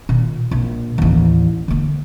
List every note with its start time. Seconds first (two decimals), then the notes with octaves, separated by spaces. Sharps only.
0.09 A#2 D#3
0.51 A#1
0.98 A1 D#2
1.68 D3 A#3